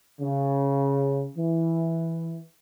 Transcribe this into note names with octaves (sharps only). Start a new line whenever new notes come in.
C#3
E3